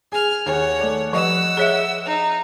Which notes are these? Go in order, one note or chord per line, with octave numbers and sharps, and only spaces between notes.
G#4 G#5 F6
D#2 G#4 C#5 F#5 G#5
A3 D5
F3 G3 B4 D#5 F#5 E6
G#4 C#5 E5
D#4